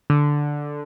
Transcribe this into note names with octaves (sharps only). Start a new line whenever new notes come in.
D3